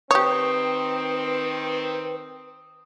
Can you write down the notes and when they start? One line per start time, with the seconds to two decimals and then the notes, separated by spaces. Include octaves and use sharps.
0.11 D#3 C4 G4 B4 C#5 D#6